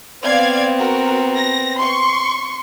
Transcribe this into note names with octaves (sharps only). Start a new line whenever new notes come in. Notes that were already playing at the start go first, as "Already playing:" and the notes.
B3 C4 D5 F5 G#6
F#4 A#4
A#6
C6 C#6